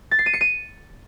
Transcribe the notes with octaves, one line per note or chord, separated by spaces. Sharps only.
A6
C7
D#7
C#7
D#7